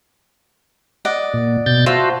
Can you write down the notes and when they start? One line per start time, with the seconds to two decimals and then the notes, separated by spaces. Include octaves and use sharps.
1.05 D5 D#5 F#5
1.34 A#2
1.66 B2 G6 A6
1.86 F4 F#4 C5 E5 A5